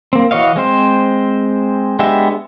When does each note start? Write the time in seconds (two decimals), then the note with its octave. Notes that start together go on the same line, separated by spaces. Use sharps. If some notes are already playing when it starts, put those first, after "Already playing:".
0.13 A#3 C4
0.31 E3 F#4 C#5 D#5 F5
0.56 G#3 C4 C5
1.99 G#3 B3 D4 G4 E5